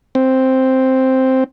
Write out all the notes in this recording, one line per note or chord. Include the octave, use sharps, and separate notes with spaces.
C4